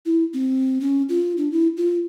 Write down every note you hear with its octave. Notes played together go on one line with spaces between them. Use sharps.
E4
C4
C#4
F4
D4
E4
F4